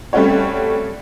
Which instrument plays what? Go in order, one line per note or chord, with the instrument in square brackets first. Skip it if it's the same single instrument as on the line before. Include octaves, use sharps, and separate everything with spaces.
[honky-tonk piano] G3 A3 C4 C#4 F#4 C#5